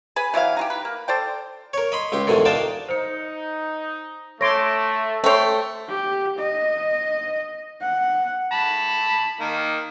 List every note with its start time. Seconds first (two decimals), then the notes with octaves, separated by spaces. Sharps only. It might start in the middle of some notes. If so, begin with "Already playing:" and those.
0.16 G#4 B4 G#5 B5
0.34 E3 F#3 E4 F5
0.57 D#4 F4 G4
0.70 B4
0.85 A#3
1.08 A4 C5 D5 G5
1.73 A#4 C#5
1.92 D#5 B5 C6
2.12 C#2 G4 C6
2.27 E2 G#2 B2 D3 D#3
2.45 D4 A#4 D#5 F5 G5 A5
2.89 D#4 C5 C#7
4.41 A3 C#5 C6 D6 A#6 D7
5.24 A3 C5 C#5 G5 C6
5.88 G4
6.38 D#5
7.81 F#5
8.52 A5 B5
9.40 D#3 A#3